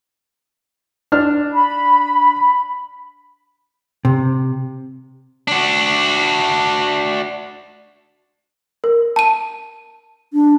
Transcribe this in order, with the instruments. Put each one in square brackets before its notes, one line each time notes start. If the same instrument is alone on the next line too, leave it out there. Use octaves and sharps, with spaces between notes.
[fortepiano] D4 F6
[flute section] B5
[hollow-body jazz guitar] C3
[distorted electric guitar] D4 F#4
[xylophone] A#4
A5 D#7
[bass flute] D4